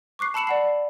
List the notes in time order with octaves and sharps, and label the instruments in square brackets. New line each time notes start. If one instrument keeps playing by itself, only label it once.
[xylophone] C#6 D6 F#6 C7
A5 B5 E6 C#7 E7 F#7
D5 F#5 C7